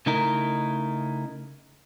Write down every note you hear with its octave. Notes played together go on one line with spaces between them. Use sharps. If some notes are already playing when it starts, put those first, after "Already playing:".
C#3 A3 D#4 E4 A#4